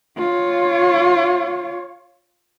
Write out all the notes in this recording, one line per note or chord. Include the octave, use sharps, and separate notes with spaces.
F4 C#5